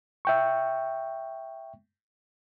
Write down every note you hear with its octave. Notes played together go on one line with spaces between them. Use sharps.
E5 G5 C#6